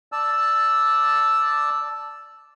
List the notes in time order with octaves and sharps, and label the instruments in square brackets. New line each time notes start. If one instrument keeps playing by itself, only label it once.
[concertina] D5 A5 E6